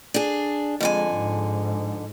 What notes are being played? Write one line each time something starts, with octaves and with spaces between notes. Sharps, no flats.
D4 G#4
F2 D3 G#3 G#5
G#2